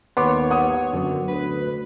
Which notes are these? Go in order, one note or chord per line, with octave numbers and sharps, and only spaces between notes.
D#2 B3 C#5 C6 D6
F#5 D#6
F#2 D3
D2 B4